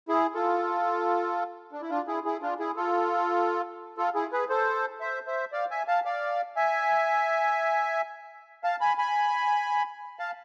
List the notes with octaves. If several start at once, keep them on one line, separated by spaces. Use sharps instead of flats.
E4 G#4
F4 A4
D4
E4
D4 F4
E4 G#4
E4 G#4
D4 F4
E4 G#4
F4 A4
F4 A4
E4 G#4
G#4 B4
A4 C5
C5 E5
C5 E5
D5 F5
E5 G#5
F5 A5
D5 F5
E5 G#5
F5 A5
G#5 B5
G#5 B5
F5 A5